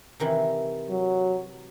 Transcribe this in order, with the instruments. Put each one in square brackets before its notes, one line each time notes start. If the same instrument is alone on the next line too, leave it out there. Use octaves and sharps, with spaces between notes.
[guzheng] C3 D#3 E3
[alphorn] F#3